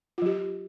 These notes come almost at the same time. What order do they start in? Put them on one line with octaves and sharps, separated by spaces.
F4 F#3 G4